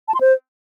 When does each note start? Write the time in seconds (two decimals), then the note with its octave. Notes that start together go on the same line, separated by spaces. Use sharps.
0.08 A5
0.14 C6
0.21 C5